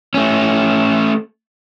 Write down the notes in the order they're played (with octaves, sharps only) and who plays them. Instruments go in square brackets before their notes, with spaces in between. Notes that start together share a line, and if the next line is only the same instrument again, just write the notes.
[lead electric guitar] A3 C#4